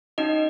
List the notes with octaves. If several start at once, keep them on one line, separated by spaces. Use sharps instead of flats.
C#4 D#4 F#4 D#5